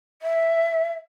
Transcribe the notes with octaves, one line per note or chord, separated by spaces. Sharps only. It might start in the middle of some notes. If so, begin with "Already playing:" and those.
E5